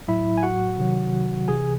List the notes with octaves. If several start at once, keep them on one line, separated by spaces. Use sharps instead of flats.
A2 F#3 E4 E5
G#5
F#4 F#5
C3 D#3 F#3
C3 E3 G#4 G#5